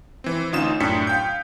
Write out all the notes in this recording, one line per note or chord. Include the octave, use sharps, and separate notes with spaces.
E3 C4
D2 C#4 D#4 F4 D#6 E7
F#2 A2 D4 G5 B6 C#7
F5 G5 G6